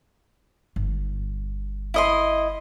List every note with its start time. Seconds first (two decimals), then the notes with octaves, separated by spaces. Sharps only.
0.76 G1
1.94 E4 D#5 C6